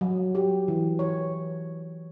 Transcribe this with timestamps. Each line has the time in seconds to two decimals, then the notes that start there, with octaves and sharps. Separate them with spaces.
0.01 F#3
0.35 G4
0.68 E3
0.99 C#5